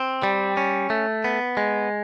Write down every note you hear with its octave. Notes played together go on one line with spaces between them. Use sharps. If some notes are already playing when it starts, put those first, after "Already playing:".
Already playing: C4
G3
C#4
A3
B3
G#3